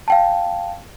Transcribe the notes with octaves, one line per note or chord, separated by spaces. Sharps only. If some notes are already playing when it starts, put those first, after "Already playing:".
F5 G5 A5